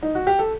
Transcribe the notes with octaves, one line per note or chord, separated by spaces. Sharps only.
D#4
F#4
G4
A4